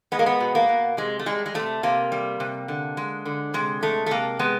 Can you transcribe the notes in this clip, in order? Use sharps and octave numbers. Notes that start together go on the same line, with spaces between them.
G#3 B3
A#3
B3
B2
A#3
B2
C3 G#3
A3
G3 G#3
G#3
C3 A3
C3 A#3
G3
C3
D3
G#3
D3
C3 G#3
G#3 A3
A3
C3 A#3
G#3 B3